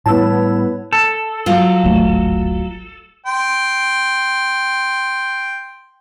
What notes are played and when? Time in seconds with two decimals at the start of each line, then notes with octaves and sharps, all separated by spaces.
0.06 A2 E3 G3 B3 C#5 A5 E6
0.93 A4
1.46 F#3 F4
1.84 D1 G#1 A3
3.26 G5 C6